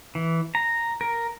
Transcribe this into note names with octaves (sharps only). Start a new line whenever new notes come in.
E3
A#5
A#4